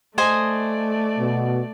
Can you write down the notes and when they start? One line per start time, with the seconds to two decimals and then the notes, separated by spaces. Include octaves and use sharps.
0.18 A3 C5 D5 D#5 G#5
1.19 B2